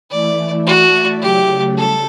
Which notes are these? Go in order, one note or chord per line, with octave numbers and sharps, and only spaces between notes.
E3 A3 E4 D5
A3 E4 F#4 A4 D5
C#3 F#3 A3 G4
G3 A4